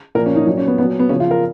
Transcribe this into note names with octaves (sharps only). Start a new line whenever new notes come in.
A#2 F3 A#4
C#4
D#4
A#2 F#3 D#4
C#4
B3
A#2 F#3 B3
B3
C#3 F3 C#4
F4
A#4